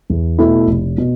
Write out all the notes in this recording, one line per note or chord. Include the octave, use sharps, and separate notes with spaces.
E2
B2 A3 E4
F1
B2